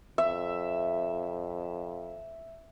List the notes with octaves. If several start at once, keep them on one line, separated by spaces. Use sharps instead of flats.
F2 E5